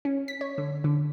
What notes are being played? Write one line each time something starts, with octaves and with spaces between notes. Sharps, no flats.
C#4
B6
C#5
D3
D3